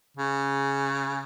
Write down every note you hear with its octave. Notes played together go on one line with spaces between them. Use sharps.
C#3